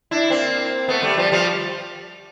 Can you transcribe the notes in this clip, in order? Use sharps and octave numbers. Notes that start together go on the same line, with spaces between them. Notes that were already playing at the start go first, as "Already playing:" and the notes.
D4 E4
A#3 C4
A3 B3
G3 A3
F3 G3
F3 G3